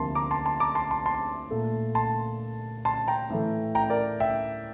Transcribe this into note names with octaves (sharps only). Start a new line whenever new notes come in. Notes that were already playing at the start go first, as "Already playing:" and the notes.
Already playing: D2 C3 F3 A#3 A5 C6
A#5 D6
A5 C6
A5 C6
A#5 D6
A5 C6
A5 C6
A5 C6
A#2 A3
A5 C6
A5 C6
G5 A#5
A2 E3 A3
G5 A#5
A#4 D5
E5 G5